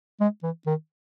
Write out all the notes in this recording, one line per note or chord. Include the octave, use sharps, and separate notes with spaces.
G#3
E3
D#3